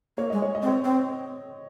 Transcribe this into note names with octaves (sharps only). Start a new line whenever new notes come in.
A#3 C#5
G#3 D#5
C#5
D#5
C4
C#5
C4